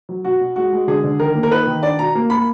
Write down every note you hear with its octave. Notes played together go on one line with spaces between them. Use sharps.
F#3
B2 F#4
B2
G#3 F#4
G#3
D3 G#4
D3
D#3 A#4
A#3
A#4
D#4 B4
D#3
D4 D5
B2 A#5
A#3
A#3 B5